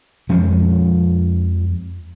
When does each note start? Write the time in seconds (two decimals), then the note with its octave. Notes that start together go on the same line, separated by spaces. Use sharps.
0.29 F2 F3 G#3 C#4